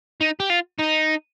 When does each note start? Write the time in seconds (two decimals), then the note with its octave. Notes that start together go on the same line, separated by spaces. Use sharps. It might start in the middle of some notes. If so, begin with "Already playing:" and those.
0.21 D#4
0.40 G4
0.50 F4
0.79 D#4